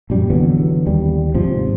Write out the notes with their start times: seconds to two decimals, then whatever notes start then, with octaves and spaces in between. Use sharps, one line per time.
0.10 A#1 F#2 G3
0.30 D3 E3 F#3 B3
0.86 D#2 G3
1.34 G#2 C3 F3